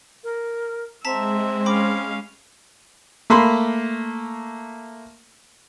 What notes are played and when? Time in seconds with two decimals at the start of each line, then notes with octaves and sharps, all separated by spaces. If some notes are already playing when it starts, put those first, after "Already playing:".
0.24 A#4
1.05 G#3 C4 E5 A5 A#5 B6
1.66 C#4 F5 G5 B5 D6
3.30 A3 A#3 B5 C6